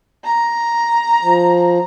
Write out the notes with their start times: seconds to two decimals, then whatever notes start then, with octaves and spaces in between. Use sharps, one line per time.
0.25 A#5
1.22 F3